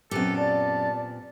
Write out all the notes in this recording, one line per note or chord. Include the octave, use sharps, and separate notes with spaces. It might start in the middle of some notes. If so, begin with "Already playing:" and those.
F#2 A#2 B3 C4 G4 A4
D5 A5